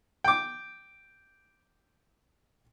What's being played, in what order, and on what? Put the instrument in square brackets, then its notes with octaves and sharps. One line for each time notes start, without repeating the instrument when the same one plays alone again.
[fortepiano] G5 D6